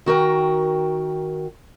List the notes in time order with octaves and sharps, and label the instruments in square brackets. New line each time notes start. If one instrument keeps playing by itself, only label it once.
[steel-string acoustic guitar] D#3 F#4 A#4 G5